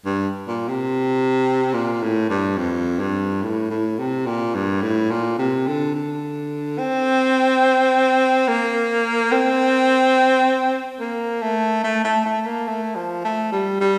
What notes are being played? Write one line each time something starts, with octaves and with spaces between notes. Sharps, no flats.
G2
A#2
C3
A#2
A2
G2
F2
G2
A2
A2
C3
A#2
G2
A2
A#2
C3
D3
D3
C4
A#3
C4
A#3
A3
A3
A3
A3
A#3
A3
F3
A3
G3
G3